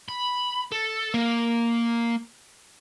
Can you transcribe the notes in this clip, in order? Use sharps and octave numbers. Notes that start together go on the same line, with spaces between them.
B5
A4
A#3